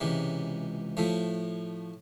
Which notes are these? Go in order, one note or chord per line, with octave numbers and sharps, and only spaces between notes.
C#2 C3 E3
A2 F3 A3